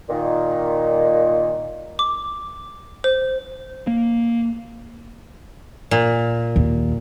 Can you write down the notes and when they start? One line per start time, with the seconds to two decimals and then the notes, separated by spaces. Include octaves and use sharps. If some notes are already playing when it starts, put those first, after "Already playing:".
0.09 A#2 D#3
1.99 D6
3.04 C5
3.87 A#3
5.91 A#2
6.56 D#2